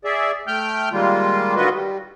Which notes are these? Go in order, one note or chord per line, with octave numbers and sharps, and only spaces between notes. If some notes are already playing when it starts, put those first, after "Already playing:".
G#4 D5 E5
A3 G5 F6 G6
D#3 G3 G#3 A#3 F4
D3 D#3 F4 F#4 B4 D#5
G3